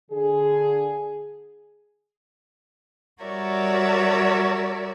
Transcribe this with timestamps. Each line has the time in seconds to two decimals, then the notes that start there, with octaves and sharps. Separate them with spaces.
0.10 D3 G#4
3.22 G3 F#4 A#4 C#5 D5 E5